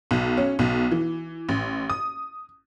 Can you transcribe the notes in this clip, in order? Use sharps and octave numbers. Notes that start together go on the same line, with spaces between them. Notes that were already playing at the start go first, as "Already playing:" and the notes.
B1
C#4
B1
E3
A1
D#6